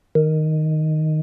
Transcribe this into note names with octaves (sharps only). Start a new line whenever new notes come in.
D#3